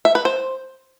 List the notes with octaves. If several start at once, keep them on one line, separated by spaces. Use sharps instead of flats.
E5
B4
C5